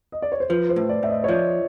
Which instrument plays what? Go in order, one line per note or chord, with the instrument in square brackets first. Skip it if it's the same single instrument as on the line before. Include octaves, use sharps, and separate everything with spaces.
[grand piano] D#5
D5
C#5
C5
[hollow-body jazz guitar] F3 [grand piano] B4
[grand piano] C5
[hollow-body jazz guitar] A2
[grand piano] D5
[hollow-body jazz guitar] A2 [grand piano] E5
[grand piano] D#5
C#5
[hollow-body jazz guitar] F3 [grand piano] D5